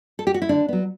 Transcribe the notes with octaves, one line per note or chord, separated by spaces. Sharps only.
A4
G4
F#4
E4
D3 D4
F#3 B3